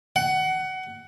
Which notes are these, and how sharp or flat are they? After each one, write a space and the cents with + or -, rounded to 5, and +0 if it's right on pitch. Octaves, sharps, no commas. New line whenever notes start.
F#5 +20